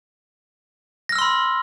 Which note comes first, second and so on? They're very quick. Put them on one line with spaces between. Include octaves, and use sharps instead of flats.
A#6 F6 E6 C6 B5